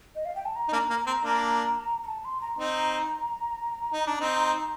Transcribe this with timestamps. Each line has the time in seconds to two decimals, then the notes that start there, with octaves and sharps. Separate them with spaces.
0.16 D#5
0.25 F5
0.36 G5
0.45 A5
0.56 A#5
0.68 D#4
0.73 A#3 D4
0.90 A#3
1.07 C4
1.23 A#3 D4
2.03 A#5
2.07 A5
2.25 C6
2.41 A#5
2.58 C4 D#4 A#5
3.93 D#4
4.07 D4
4.21 C4 D#4